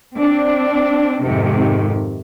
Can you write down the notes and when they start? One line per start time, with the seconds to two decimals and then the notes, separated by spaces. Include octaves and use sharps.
0.15 C4 D4
1.23 F2 G#2 C3 D#3